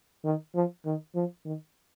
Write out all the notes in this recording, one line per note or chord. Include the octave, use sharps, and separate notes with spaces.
D#3
F3
D#3
F3
D#3